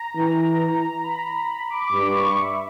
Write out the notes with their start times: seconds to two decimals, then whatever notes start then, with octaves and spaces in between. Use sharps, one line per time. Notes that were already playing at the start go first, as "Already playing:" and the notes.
Already playing: A#5
0.16 E3
1.04 B5
1.48 B5
1.70 D6
1.92 G2 D6
2.07 C#6
2.21 C#6
2.36 E5